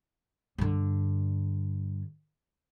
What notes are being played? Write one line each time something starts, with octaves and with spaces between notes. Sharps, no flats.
G2 D3